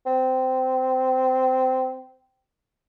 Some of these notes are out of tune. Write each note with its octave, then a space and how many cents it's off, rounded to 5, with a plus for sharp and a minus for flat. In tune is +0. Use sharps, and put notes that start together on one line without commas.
C4 -15